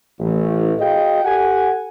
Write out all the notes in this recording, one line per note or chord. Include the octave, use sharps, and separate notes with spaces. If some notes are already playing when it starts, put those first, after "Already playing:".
A1
F#4 G#4 D#5 F5 G5
G4 A4 F#5 G#5